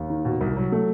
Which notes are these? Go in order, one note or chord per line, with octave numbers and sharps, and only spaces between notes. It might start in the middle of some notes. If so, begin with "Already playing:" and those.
Already playing: D#2
D#3
B2
C2
F#3
A3